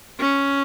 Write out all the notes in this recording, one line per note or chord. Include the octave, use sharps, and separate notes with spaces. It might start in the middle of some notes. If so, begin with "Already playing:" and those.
C#4